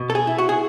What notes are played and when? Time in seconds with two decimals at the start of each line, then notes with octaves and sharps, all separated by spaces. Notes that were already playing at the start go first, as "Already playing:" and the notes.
Already playing: B2
0.10 A4
0.15 G#4
0.27 E4
0.38 F#4
0.49 G#4